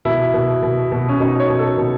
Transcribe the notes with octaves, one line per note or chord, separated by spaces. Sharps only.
B2 E4
B2
B2
B2
C#4
B2 D#4
C#5
B2
A4
B2